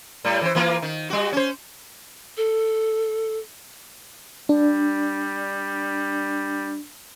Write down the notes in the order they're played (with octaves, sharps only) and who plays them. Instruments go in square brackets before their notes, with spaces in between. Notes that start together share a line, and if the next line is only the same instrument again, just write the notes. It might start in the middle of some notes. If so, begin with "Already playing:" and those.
[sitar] A2 G3
E3 C5
E3 A#3 F4
D#3
G3 F#4
C#4 C5
[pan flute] A4
[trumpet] G3 [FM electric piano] D4